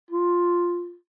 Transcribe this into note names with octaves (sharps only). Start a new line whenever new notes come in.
F4